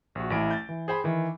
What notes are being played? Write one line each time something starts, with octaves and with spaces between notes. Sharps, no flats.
A#1 F#4
A1 A3 E4 D7
G6 A6
E3
G#4 C5 G5 B5
D#3 E3